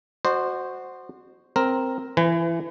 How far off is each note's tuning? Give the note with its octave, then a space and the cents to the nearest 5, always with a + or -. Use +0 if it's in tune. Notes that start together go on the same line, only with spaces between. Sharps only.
F#4 +0 C5 +0 D#5 -45
C4 +0 A#4 +0
E3 +25 B4 +35 G#5 +0